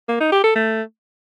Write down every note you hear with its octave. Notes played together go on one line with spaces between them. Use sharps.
A#3
D#4
G4
A4
A3